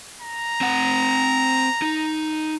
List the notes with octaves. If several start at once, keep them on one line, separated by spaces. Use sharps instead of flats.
A#5
C4 F#5
D#4